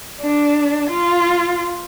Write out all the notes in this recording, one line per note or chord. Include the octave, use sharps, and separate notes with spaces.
D4
F4